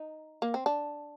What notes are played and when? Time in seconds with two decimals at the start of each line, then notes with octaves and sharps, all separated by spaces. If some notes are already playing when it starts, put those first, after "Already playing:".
Already playing: D#4
0.42 A#3
0.54 C4
0.66 D4